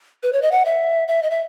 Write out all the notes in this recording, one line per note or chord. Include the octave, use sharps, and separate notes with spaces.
B4
C#5
D#5
F#5
E5
E5
D#5
E5